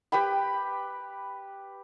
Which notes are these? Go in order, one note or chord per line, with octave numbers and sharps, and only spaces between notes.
G4 B4 G5 B5